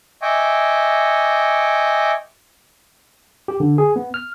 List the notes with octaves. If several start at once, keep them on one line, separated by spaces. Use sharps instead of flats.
D#5 E5 G5 G#5 C#6 D6
G4
D3
G#4
B3
F6